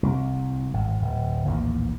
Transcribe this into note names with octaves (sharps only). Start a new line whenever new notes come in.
C2
G#1
D1
A#1 D#2 A2 E3